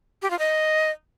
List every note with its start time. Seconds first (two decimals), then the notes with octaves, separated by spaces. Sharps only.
0.22 G4
0.31 F4
0.39 D#5